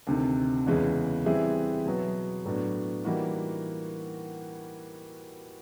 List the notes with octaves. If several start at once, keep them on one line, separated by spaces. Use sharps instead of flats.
D2 C3 D#3
E2 C#3 E3 G#3
E3 G3 C4 E4 G#4
B2 F#3 B3
A2 F#3 B3 D4
E3 G3 A#3 D#4 F#4